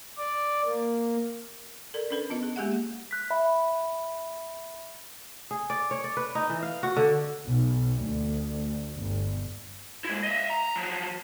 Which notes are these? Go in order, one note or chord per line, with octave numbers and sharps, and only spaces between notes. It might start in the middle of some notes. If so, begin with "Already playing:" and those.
D5
A#3
A4 A#4 D5
C#4 D4 A4 B4
B3 F4 D#5
G#4
G#3 A#3 G4 G#4 E5 F#5
F#6 B6
E5 B5
G#4
D5
C#5
D5
B4
D#4
E3
F5
F#4
D3
B1
D2
G1
G#3 E4
D#5 E5
A#5
F3 F#3